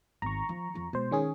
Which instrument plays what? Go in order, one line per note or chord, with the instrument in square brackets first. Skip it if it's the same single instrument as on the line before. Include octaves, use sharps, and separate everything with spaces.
[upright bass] G#1 [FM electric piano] A#5 C#6
[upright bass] F3
F2 F3
[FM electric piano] B2 C5 [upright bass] G#3
[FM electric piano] D#3 C#4 G#4